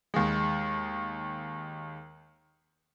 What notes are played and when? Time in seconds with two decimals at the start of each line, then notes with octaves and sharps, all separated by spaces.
0.14 D#2 G#3